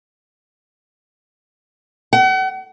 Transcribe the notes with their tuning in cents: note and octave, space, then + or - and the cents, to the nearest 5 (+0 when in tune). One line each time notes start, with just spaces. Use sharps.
F#5 +40